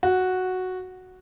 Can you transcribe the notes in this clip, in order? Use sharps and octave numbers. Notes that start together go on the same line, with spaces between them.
F#4